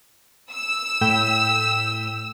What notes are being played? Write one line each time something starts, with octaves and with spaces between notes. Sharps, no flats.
E6
A2 G5 B6